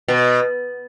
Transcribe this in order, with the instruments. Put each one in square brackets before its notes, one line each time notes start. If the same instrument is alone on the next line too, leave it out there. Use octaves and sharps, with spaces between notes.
[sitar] B2